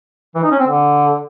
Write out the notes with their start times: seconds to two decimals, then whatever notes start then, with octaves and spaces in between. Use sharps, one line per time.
0.35 E3
0.43 D#4
0.51 C#4
0.59 C4
0.67 D3